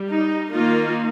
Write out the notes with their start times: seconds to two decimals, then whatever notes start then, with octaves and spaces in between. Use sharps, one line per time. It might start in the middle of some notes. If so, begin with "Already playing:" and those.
Already playing: G3
0.11 D#4
0.52 D#3 A#3 D#4 F4